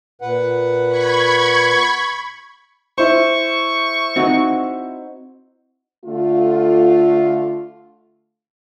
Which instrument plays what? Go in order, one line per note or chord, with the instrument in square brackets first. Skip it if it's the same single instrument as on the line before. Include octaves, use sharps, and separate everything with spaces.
[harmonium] A#2 B4 F#5
[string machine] B5 C#6 G#6
[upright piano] E4 C5 [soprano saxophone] C#6
[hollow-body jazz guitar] C4 D#4 F#4
[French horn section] D3 A3 F4